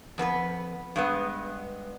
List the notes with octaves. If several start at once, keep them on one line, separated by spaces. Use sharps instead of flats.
F2 B3 F#4 B4
G2 G#3 B3